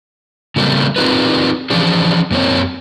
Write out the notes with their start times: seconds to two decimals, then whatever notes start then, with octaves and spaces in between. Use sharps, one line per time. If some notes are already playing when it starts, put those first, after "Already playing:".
0.56 C#3 F#3 G3 A3 A#3 C4
0.96 C4 D#4 F4 G#4 A#4 B4
1.70 E3 F3 C#4 D4 G#4 C5
2.31 F#2 A#3 C4 C#5